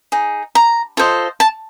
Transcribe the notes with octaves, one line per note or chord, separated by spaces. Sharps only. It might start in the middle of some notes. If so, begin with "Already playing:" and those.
D#4 G#4
A#5
F4 A4 C5 D#5
A5